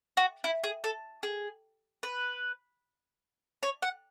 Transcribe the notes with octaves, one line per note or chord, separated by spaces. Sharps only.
F#4
E4
G#4
A4
G#4
B4
C#5
F#5